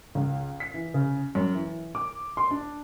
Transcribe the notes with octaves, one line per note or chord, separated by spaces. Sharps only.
C#2
B6
E3
C#3
F#2
E3
D6
C6
D4